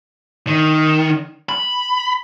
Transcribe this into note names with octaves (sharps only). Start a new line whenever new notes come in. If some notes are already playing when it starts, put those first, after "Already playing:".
D#3
B5